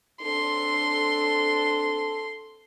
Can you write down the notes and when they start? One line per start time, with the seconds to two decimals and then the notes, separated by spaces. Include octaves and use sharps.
0.22 C4 D4 A4 C6